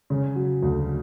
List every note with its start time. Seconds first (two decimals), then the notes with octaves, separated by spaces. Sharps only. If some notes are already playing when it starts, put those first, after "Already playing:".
0.10 C#3
0.36 F#3
0.62 D2